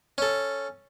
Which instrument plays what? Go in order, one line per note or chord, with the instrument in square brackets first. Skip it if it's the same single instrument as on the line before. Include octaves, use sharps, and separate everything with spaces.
[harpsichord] C#4 A4